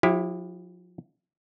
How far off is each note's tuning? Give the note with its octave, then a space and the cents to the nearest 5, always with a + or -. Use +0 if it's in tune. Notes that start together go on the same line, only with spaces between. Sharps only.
F3 +40 E4 +0 G4 +20